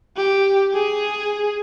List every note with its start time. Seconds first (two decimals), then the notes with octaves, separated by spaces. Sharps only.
0.17 G4
0.74 G#4